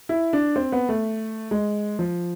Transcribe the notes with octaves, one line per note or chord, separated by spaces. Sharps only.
E4
D4
C4
B3
A3
G#3
F3